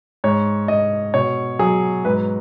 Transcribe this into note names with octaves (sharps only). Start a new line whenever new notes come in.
G#2 C#5
G#2 D#5
B2 C#5
F#3 G#4
G#2 B4